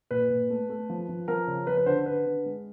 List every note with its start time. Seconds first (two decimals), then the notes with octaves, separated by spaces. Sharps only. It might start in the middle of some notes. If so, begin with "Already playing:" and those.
0.11 A#2 B4
0.30 A#2
0.50 A3
0.69 A3
0.90 F3
1.09 F3
1.28 F3 A#4
1.48 C#3
1.67 F3 B4
1.77 B4
1.86 D3 C5
2.06 D3 B4
2.26 D3
2.46 G#3